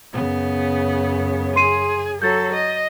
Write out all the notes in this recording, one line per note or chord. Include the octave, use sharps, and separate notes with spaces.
F#2 C#3 B3
G#4 C6 C7 D#7
F#3 A4 G6 A6
D#5